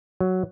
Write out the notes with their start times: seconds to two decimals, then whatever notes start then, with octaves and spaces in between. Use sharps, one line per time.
0.21 F#3